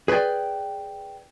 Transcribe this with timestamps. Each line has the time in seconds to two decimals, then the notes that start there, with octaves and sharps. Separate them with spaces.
0.08 G#4 B4 C5 D5 G5